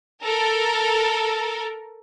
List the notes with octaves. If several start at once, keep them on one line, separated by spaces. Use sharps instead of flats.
A4 A#4